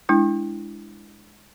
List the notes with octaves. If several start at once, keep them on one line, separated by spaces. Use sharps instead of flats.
G#3 D4 E4